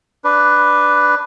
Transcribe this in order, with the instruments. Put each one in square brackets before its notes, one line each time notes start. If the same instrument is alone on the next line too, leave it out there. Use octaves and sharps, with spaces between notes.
[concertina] D4 B4